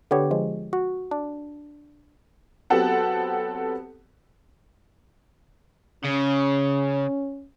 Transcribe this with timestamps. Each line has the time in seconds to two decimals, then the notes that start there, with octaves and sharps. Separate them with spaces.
0.11 D3 B3 G4 C#5
0.31 F3 G#3
0.73 F#4
1.11 D4
2.70 F#3 B3 C4 G4 A4 F#5
6.04 C#3 C#4